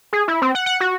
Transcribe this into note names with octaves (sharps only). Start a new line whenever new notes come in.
G#4
E4
C4
F#5
F#5
F#4